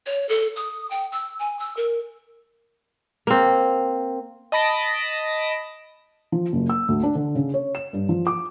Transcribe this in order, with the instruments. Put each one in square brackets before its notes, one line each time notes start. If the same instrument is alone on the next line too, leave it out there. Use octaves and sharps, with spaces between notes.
[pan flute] C#5
A4
D#6
G5
E6
G#5
E6
A#4
[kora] A#3 C4
[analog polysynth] D#5 A5 B5 A#6 D7
[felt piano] F3
F#1
E6
D2
D4
D3
C#3
C#5
E7
G2
F3
D6